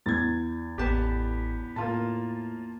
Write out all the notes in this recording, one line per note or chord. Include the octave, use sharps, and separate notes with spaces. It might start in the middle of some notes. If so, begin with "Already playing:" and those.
E2 G#6 A6
A1 B3 G4 A5
A2 A#3 F4 A5